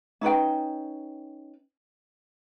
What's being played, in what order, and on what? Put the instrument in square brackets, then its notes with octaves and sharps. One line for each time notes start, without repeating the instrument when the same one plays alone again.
[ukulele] C#4 D#4 B4 G5